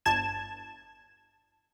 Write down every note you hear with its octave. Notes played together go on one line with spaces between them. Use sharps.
G1 A5 G#6 E7